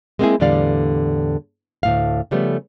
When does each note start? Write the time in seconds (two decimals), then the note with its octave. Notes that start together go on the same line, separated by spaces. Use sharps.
0.19 G#3 A#3 C4 D4 E4 G#4
0.40 E2 A2 D3 G3 D5 F5
1.83 D2 A2 F5
2.31 C#3 F3 G3 A3 B3